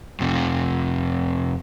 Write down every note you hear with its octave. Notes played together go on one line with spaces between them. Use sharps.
F2 C3